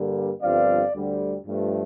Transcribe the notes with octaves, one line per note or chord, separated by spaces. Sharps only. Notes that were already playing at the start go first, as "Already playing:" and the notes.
Already playing: G2 D3 G3 A#3
G1 G2 F3 C4 D5 F5
D2 D3 G3
G2 F3 A3